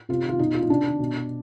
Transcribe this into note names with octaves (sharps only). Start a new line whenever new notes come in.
C3 F4
D#3 F4
B2 D#4
F4
D#4
C3 D4
D#3
B2